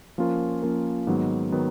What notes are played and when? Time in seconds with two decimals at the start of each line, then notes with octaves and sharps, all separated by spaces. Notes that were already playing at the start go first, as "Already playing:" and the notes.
0.18 F3 A#3 C#4 F4 A#4
0.63 F3 A#3 C#4 F4 A#4
1.07 G#2 D#3 F#3 B3
1.52 D#3 F#3 B3